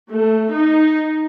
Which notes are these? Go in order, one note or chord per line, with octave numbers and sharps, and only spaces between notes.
A3
D#4